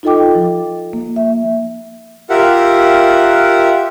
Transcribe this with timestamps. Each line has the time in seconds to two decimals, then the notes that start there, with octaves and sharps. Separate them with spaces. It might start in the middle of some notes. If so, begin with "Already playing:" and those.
0.03 D#4 F4 A4 D#5 G5 D6
0.35 F3
0.93 A#3
1.16 E5
2.30 F4 G4 A#4 E5 F#5